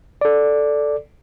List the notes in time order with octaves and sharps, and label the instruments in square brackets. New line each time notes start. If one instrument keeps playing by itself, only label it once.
[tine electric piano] A4 D5